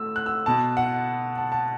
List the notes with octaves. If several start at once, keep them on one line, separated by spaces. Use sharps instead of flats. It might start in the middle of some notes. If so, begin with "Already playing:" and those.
Already playing: A2 A3 E6
F#6
E6
B2 B3 A5
F#5
A5
A5